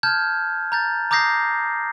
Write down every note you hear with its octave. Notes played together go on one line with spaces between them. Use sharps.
A5 F6 G6 G#6
A#5 G6 A6
A#5 D6 D#6 G6 A#6 C7